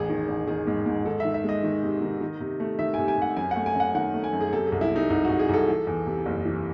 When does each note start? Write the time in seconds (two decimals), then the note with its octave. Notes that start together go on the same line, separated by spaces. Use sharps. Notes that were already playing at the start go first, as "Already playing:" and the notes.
Already playing: E1 A1 G#4
0.09 D#3
0.28 A1
0.47 D#3 G#4
0.67 G#2
0.86 G#2
1.05 D#3 A4
1.20 D#3 E5
1.34 E5
1.44 G#3 D#5
1.63 D#3
1.83 C3
2.02 D#3
2.21 D#3
2.40 C3
2.60 A3
2.79 D#3 E5
2.94 C3 G#5
3.08 G#5
3.18 C3 F#5
3.37 F#2 G#5
3.51 A3 F#5
3.66 G#5
3.75 F#2 F#5
3.95 D#3 F#5
4.14 A3
4.24 G#5
4.33 F#2
4.41 G#4
4.52 C3 A4
4.67 G#4
4.72 C2
4.81 E4
4.91 C3 D#4
5.10 C2 D#4
5.25 F#4
5.30 C2
5.39 G#4
5.49 C2 A4
5.68 E3
5.87 E2
6.06 C3
6.26 F#1
6.45 E3